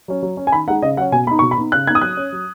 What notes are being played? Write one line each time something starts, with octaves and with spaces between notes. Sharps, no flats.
F#3 C#4
F#3
C#4
G#5
D#3 B5
G#3 D#4 F#5
C#3 D#5
F#3 C#4 F#5
B2 G#5
B3 D#4 B5
B2 C#6
B5
B3 D#4
C#3 F#6
B3 D#4 G#6
D#6
F#3 F#6
C#4
F#3